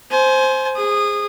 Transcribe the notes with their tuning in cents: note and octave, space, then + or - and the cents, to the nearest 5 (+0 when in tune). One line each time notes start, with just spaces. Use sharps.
C5 +0 G#5 +30
G#4 -15 D#6 -20